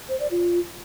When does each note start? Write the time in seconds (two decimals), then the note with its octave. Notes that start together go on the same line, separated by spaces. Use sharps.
0.09 C5
0.20 D5
0.31 F4